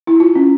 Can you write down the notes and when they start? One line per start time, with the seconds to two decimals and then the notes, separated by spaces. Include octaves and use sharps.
0.07 E4
0.20 F4
0.35 C#4